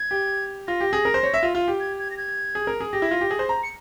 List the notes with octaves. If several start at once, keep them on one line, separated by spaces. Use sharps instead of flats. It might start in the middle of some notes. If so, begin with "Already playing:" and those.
Already playing: G#6
G4
F4 A#6
G4
G#4
A#4
C5
C#5
E5
F4
F4
G4
G#6
G#6
A#6
G#6
G#4
A#4
G#4
G4 A#6
E4
F4
G4
G#4
C5
A#5
C#7